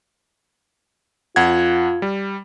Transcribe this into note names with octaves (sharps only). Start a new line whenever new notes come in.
F2 F4 F#5 G#6
G3